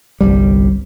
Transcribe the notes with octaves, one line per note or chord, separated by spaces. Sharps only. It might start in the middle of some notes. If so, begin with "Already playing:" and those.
G1 C2 G3